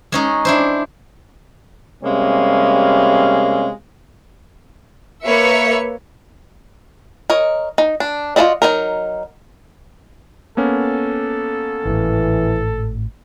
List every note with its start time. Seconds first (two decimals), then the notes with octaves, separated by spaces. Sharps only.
0.12 G#3 C#4 D#4
0.45 D4 E4 C5
2.04 C3 G3 G#3 A#3 C#4 F5
5.25 A#3 B4 C#5 E5 C#7
7.30 A#4 C#5 D#5
7.78 D#4
8.00 D4
8.36 F4 F#4 A4 D5 D#5
8.62 F#3 C4 D#4 A#4
10.57 A#3 B3 C#4 A4
11.85 G#1 A2 E3